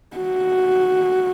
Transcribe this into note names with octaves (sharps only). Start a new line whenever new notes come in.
F#4